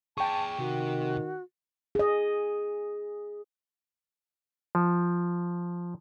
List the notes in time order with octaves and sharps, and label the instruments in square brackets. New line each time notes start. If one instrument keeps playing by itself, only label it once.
[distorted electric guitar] G#4 D5 [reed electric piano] G5 C#6 [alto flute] A5
[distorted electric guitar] C3 [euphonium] D#3 [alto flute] F#4
[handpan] G#4 D#5
[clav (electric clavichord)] F3